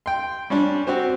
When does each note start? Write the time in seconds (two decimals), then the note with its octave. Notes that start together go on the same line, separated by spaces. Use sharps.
0.06 G5 C6
0.50 G3 C#4 D4
0.87 C4 F#4 G4 C5